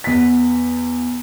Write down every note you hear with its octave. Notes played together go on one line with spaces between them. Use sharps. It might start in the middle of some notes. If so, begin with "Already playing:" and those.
E2 B6